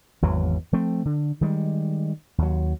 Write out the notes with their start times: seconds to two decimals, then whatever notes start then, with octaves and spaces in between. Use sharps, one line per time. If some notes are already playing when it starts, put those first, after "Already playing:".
0.22 G#1 E2 E3 F#3
0.73 F3 A3 C4
1.05 D3
1.41 D#3 G3 G#3
2.38 D#2 F#3